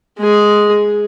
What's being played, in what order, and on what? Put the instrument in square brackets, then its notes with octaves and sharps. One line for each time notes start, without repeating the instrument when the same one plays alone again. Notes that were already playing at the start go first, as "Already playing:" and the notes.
[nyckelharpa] G#3 G#4